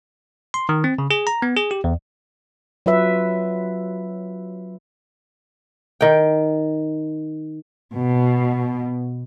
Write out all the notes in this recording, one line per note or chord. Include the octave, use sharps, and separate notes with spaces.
C6
D#3
C4
C#3
G#4
A#5
B3
G#4
G4
E2
F#3 F4 B4 E5
D#3 G5
B2